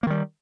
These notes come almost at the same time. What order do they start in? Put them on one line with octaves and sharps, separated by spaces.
A#3 D#3 G3